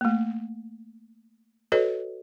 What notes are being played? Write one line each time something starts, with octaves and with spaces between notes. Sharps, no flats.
A3 A#3
F#4 A4 B4 C#5 D#5